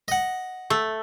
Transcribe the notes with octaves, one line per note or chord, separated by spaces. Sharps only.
D#5 F#5
A3